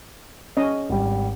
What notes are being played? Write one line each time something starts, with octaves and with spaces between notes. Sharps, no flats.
C#4 D#5
G#1 G3